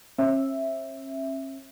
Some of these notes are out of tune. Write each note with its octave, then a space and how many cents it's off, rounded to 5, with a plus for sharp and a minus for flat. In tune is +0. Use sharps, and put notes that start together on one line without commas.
C#4 -45 E5 +0